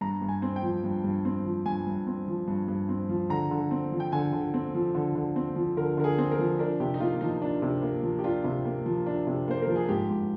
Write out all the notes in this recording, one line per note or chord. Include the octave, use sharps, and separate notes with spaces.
G2 A#5
G2
G#5
C4
G5
F3
G2
G2
C4
F3
G2 G#5
G2
C4
F3
G2
G2
C4
F3
D3 A#5
D3
C4
F3
G5
D3 G#5
D3
C4
F3
D3
D3
C4
F3
D3 A#4
D3 A#4
G#4
C4
A#4
F3
D4 A#4
C3 G4
D#4
A#3 F4
F3 D#4
D4
C3
A#3
F3
G4
D4 F4
C3
A#3
F3
D4
C3
A#3 C5
F3 A#4
G#4
G#2 G4
G#2